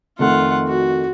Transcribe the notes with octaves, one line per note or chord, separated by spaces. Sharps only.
F2 D#3 A3 F4 F#5
F#4